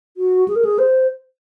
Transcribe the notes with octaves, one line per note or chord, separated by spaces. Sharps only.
F#4
G#4
A#4
G#4
C5